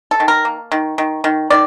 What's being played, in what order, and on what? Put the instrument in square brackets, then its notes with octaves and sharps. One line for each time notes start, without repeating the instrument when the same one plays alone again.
[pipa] A4
D#3
A#4
A#3
D#3
D#3
D#3
D#3 D5